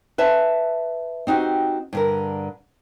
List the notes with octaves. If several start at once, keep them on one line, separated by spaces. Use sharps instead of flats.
B4 E5 A5
C4 D#4 F#4 G4
G2 D3 A#4